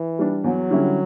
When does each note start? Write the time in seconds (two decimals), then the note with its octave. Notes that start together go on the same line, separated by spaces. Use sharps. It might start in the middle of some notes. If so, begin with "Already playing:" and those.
Already playing: E3
0.19 G3 D4
0.44 E2 F#3
0.70 D3 G3 C#4 E4